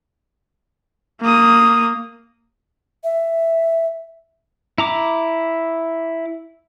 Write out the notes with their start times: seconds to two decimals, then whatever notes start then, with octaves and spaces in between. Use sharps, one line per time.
1.21 A#3 D#6
3.04 E5
4.78 E4 A#5 D6